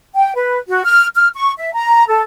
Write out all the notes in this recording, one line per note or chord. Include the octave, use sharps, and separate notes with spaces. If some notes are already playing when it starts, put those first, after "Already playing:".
G5
B4
F#4
F6
F6
C#6
E5
A#5
A4